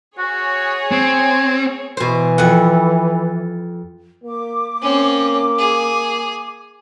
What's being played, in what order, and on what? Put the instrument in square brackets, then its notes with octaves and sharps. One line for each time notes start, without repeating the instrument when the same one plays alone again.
[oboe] F#4 [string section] G#4 C#5
[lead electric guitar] C4 [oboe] G#5
[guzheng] B2 C5 [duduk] E3
[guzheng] F2 F#5
[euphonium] A#3 [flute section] D6
[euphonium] A#3 [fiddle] C4 C#4
[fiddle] G#4